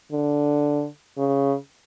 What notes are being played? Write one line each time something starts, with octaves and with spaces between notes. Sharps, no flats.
D3
C#3